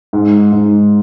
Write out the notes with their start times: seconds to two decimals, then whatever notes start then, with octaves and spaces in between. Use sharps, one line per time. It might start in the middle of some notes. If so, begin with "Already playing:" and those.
0.13 G#2
0.52 G#2